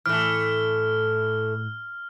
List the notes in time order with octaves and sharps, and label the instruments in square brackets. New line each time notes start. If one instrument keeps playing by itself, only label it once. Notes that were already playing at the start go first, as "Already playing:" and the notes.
[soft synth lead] A2 [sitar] E3 A3 [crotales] F6